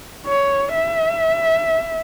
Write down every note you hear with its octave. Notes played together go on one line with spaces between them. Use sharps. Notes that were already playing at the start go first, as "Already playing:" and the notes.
C#5
E5